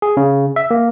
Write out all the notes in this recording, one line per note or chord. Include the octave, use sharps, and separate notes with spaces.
G#4
C#3
E5
A#3